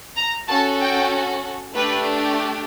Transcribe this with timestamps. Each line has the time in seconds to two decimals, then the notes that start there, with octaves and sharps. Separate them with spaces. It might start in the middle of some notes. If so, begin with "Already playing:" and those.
0.17 A#5
0.48 C#4 F#4 A4 A5
0.80 G5
1.75 A3 D4 G4 B4